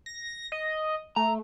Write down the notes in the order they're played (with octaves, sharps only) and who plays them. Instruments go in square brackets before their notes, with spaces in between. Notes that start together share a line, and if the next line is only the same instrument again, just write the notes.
[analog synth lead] A#6
D#5
[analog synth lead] A3 [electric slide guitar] A#5